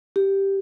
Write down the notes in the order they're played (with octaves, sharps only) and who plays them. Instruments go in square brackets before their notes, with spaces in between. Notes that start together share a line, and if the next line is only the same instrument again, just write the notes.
[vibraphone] G4